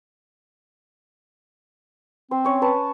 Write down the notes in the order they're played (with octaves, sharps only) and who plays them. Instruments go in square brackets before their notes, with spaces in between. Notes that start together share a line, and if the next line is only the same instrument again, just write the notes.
[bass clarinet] C4 [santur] C5
[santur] C#4 C#5
B4 A5